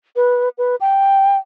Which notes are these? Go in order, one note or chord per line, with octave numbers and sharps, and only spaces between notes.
B4
B4
G5